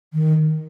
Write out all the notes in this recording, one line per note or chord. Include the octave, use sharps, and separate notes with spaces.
D#3